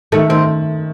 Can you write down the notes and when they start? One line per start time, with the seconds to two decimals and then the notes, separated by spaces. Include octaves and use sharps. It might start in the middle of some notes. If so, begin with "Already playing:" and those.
0.12 D#3 A3
0.29 D#3 C4